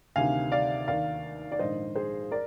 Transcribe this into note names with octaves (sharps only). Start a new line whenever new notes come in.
D2 C3 D#3 F5 G#5
D5 F5
D#2 D#3 D5 F5
D5
A#1 G#2 D#3 C5 D#5
G#4 C5
A#4 D5